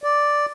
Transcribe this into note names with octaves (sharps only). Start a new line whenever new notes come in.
D5